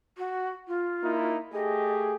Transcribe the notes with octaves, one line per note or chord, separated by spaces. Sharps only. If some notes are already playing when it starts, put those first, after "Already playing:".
F#4
F4
A#3 D#4 E4
A3 G4 G#4 D#5